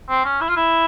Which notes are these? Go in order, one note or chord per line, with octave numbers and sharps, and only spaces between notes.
C4
C#4
E4
F4
E4